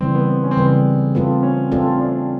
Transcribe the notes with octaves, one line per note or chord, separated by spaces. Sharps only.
C#3 E3 G3 C4
B3
C4
C#4
C4
C#3 E3 G3 B3
C4
A3 B3 C4 F4 A4
C#4
A3 C4 D4 F4 A4
D4